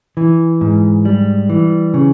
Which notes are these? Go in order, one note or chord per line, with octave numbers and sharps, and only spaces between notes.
E3
G#2
G3
E3
C#3